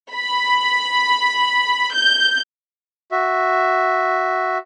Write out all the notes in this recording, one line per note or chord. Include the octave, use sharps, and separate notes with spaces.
B5
G6
F#4 E5